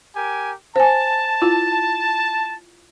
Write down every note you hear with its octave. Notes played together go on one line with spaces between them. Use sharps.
G4 A#4 G#5
C5 G#5 A5
E4 F4